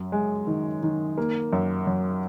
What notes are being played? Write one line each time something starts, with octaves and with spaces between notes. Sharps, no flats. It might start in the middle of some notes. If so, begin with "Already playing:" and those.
Already playing: F#2
G#3
D#3
D#3
A#3
F#2
F#2